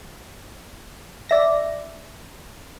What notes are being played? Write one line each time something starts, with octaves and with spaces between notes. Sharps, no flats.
D5 E5 A#6